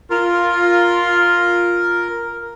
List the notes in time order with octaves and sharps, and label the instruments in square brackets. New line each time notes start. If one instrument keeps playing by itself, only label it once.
[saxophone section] F4 [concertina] A#4